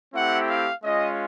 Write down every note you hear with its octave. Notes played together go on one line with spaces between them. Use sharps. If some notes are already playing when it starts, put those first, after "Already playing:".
A3 C4 E4 G4 F#5
F5
G#3 C#4 F4 D#5